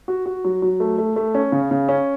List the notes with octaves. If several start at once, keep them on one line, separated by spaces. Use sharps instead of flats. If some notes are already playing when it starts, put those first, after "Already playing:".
F#4
F#4
F#3
F#3
A3
A3
A3
C#4
C#3
C#3
C#4